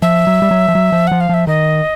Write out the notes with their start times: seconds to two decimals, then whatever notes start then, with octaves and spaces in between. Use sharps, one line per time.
0.02 F3 E5
0.27 F#3
0.42 G3
0.51 F#3
0.68 F3
0.75 F#3
0.92 F3
1.07 F3 F#5
1.21 F5
1.29 F3 E5
1.47 D#3 D#5